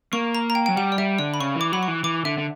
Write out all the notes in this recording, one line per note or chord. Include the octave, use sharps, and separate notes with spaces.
A#3 C#6
A#5
A#5
G5
F#3 G5
G3 F#5
D5
G3 E5
D3 D5
B5
C#3 C#6
E3 D6
F#3 B5
C#6
E3
E3 D6
D3 E5
D3